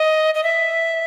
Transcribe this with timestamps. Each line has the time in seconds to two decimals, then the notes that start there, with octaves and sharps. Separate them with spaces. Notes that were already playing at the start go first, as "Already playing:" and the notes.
Already playing: D#5
0.35 D#5
0.44 E5